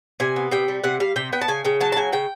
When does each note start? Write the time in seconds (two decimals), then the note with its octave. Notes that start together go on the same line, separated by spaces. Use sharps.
0.20 C3 G#5
0.36 B3
0.51 C3 G5
0.68 G3
0.84 C3 F#5
1.00 G3 F5
1.16 C3 G5
1.33 B3 G5
1.41 A5
1.48 C#3 G#5
1.65 C#3 G5
1.80 F#3 A5
1.92 A5
1.96 C#3 G#5
2.12 C#3 G5